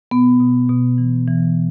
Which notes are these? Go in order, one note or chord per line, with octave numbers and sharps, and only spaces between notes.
B2 B3
B2
B2
E3
E3